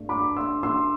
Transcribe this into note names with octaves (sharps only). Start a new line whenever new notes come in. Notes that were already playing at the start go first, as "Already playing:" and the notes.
Already playing: G2 A3
B5 D6
C6 E6
C6 E6